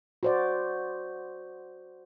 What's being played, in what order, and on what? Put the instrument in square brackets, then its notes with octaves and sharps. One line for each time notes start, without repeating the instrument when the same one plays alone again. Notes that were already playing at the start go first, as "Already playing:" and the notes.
[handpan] F#4 C5 D5